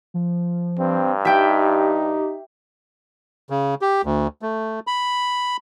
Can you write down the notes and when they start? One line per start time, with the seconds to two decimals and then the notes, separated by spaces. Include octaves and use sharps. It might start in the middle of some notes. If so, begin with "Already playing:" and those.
0.14 F3
0.79 G2 C4
1.25 D#4 G4 E5 G5
3.50 C#3
3.81 G4
4.05 D2
4.42 A3
4.87 B5